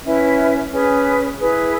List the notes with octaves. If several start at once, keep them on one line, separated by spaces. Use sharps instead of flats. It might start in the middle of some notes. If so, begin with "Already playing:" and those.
C#4 E4 B4 E5
C#4 G#4 B4
E4 G#4 B4